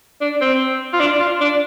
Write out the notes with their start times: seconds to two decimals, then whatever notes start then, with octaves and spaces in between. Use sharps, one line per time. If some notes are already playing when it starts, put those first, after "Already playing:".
0.21 D4
0.41 C4
0.93 F4
1.00 D4
1.20 F4
1.41 D4